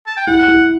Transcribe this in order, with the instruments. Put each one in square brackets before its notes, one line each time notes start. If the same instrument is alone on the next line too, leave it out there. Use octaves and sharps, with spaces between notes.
[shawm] A5
G5
[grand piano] E4 [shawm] F#5
[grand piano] E4